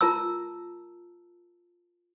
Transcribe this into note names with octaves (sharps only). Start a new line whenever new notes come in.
F4 A#4 A5 A#5 E6